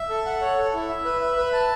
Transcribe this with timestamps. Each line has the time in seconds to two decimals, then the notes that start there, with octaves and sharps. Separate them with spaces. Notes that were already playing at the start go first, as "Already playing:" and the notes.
Already playing: E5
0.10 A4
0.26 F#5
0.41 C#5
0.58 A4
0.74 E4
0.89 E5
1.05 B4
1.21 E5
1.37 B4
1.53 A5